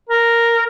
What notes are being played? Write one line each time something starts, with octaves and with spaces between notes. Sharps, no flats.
A#4